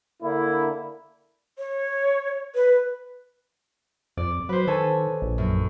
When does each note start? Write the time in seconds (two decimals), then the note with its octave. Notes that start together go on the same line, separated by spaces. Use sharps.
0.22 D3 A#3 E4
1.58 C#5
2.55 B4
4.17 F2 D5
4.49 F#3 B4 C5
4.67 D#3 A4 C#5 G#5
5.22 A#1
5.38 F#2